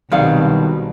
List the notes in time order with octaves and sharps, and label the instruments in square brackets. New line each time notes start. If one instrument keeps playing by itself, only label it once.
[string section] C2 [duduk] B2 [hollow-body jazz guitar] D#3 F#3 C4 [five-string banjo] G3 G#4 F5